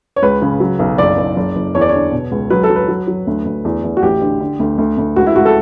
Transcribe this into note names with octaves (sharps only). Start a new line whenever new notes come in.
C#5
C#2 B4
C#3
F#3
B1
F#1 D5
F#1
F#1
F#1
E2 C#5
D5
D3 C#5
B2
C#2
F#3 B4
A4
F#3
B4
F#3
F#3
D2
D2
E2
E2
F#4
A1 G4
D3
D3
D2
D2
D2
C#2 F#4
E4
C#2 F#4
A4